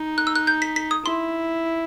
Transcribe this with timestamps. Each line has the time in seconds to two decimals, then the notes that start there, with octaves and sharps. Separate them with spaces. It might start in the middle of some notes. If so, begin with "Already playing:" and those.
Already playing: D#4
0.18 F#6
0.27 E6
0.36 F#6
0.47 G6
0.62 B6
0.76 B6
0.91 D#6
1.05 E4 C6